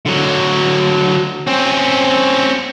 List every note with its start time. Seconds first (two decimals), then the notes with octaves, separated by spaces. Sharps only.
0.06 D3 F#3
1.47 C4 C#4